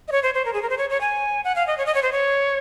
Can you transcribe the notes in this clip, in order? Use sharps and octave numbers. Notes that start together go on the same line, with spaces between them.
D#5
C#5
C5
C5
A#4
G#4
A#4
C5
C#5
C#5
G#5
F#5
F5
D#5
C#5
D#5
C#5
C5
C#5